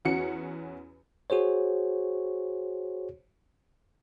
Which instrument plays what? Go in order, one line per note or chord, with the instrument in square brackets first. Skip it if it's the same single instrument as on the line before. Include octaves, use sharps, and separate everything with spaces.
[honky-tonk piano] E2 C#4 F#4 C#7
[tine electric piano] F#4 G#4 C5 C#5